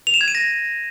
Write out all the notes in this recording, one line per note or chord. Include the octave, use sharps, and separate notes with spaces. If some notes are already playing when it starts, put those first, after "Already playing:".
F7
E7
G#6
D#7
A#6